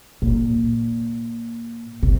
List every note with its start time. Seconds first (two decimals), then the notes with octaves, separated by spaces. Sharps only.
0.22 A#2
2.03 C3